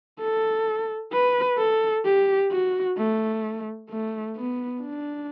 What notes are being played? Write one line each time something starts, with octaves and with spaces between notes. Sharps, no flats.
A4
B4
A4
G4
F#4
A3
A3
B3
D4